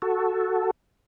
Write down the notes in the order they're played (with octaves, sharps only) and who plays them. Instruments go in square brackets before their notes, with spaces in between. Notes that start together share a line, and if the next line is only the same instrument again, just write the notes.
[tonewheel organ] F#4 A4